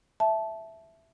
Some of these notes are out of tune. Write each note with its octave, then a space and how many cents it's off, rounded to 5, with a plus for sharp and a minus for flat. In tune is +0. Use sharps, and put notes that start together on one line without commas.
E5 +0 A5 -15